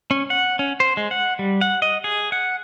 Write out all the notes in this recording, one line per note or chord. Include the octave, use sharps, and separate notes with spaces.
C#4
F#5
C#4
C5
G#3
F#5
G3
F#5
D#5
G#4
F#5